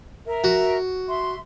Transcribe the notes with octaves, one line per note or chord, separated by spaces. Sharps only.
A#4 E5
F#4
E5 C6